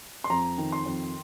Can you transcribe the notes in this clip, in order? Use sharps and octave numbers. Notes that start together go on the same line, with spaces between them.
C6
F2 A#5
D#3
C6
F2